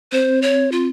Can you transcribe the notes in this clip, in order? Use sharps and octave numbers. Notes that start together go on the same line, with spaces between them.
C4 C5
C#5
F4